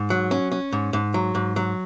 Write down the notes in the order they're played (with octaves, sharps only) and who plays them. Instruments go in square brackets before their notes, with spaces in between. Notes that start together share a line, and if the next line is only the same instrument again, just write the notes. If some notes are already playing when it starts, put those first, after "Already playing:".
Already playing: [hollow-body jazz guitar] G#2
F#3
C#4
C#4
G#2
G#2
F#3
G#2
F#3